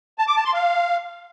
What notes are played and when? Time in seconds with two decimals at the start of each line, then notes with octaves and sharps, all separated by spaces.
0.18 A5
0.27 D6
0.36 A5
0.45 C6
0.54 F5